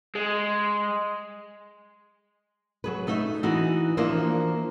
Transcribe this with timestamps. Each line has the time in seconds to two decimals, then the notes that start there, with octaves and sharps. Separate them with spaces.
0.15 G#3
2.84 F#3 G#4 B4
3.07 A3 D#4 D#5 E5
3.43 E3 D#4 F#4 G#4 B4
3.97 E3 F3 A#3 D4 C5 E5